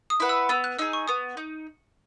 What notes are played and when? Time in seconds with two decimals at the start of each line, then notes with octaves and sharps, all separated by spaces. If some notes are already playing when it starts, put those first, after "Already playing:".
0.10 D#6
0.20 E4 B4 F#5
0.29 E6
0.49 B3 E6
0.64 F#6
0.79 D#4 G#4 E6
0.93 C#6
1.08 B3 D#6
1.37 D#4